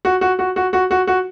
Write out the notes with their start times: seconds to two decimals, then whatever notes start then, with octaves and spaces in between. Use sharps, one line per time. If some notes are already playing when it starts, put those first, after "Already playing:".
0.05 F#4
0.21 F#4
0.39 F#4
0.56 F#4
0.73 F#4
0.91 F#4
1.07 F#4